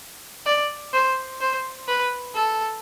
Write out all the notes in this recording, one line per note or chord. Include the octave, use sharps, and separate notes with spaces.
D5
C5
C5
B4
A4